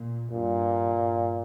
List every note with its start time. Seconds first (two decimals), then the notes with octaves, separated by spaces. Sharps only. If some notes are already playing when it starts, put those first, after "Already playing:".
Already playing: A#2
0.32 G2 A#2